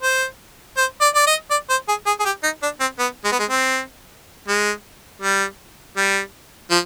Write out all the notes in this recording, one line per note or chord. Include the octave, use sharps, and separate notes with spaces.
C5
C5
D5
D5
D#5
D5
C5
G#4
G#4
G#4
G4
D#4
D4
C4
B3
G#3
B3
G#3
C4
G#3
G3
G3
F3